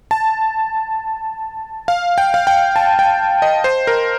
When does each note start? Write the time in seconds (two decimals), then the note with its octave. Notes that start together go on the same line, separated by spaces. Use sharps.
0.11 A5
1.88 F5
2.18 G5
2.34 F5
2.47 G5
2.76 A5
2.99 G5
3.42 D#5
3.64 C5
3.87 A#4